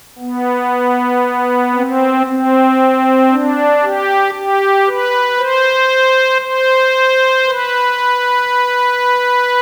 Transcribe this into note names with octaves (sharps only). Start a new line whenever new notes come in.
B3
C4
C4
D4
G4
G4
B4
C5
C5
B4